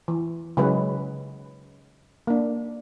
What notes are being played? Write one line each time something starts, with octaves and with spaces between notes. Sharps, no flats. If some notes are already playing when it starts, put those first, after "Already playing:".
E3
C#3 F#3 G#3 C#4 B4
A#3 D4